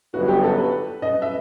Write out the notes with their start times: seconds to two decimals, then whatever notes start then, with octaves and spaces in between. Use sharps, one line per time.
0.13 G1 F#2 F#3 B3 F#4
0.28 G4
0.43 A4
0.58 B4
1.02 D#5
1.22 E5